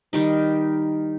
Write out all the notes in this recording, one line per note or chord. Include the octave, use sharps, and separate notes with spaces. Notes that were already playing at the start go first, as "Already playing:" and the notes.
D#3 G3 D#4